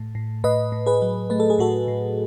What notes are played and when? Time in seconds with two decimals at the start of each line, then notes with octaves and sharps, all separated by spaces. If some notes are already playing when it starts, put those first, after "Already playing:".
Already playing: A2 A3
0.15 A2
0.44 A2 B4 D#5
0.72 A2
0.86 G#4 B4
1.02 F#3
1.30 A3 B4
1.40 A4
1.50 G#4
1.59 A2 F#4 A4
1.88 A2